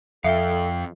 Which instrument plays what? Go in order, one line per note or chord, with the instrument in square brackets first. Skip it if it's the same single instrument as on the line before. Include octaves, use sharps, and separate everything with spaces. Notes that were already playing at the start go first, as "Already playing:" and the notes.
[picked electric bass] F2 [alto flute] A4 [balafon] E5 [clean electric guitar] F5 G5